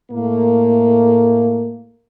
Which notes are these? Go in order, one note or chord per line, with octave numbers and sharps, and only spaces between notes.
A2 A3 A#3